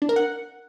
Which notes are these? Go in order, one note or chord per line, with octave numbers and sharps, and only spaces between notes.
D4
A#4
F#5